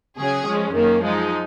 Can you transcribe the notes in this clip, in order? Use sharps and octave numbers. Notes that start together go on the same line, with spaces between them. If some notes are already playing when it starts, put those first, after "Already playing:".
C#3 F#3 C#4 G#4
F3 G#3 C#4
F#2 D#3 A#3 C#4
F3 G#3 D#4